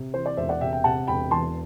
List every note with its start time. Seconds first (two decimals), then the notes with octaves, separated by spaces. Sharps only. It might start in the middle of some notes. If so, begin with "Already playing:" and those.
Already playing: C3
0.13 E3 C5
0.26 D5
0.37 E1 C5 E5
0.49 D5 F#5
0.61 C3 E5 G5
0.73 E5 G5
0.84 C3 F#5 A5
1.07 E1 G5 B5
1.31 E2 A5 C6